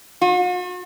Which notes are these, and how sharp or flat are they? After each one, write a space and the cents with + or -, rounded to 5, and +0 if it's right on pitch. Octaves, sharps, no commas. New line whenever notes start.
F#4 -45